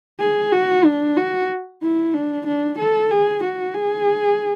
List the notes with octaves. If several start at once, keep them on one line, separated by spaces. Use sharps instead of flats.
G#4
F#4
D4
F#4
E4
D4
D4
A4
G#4
F#4
G#4